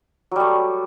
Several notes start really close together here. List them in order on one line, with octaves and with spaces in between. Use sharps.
F#3 G3 A3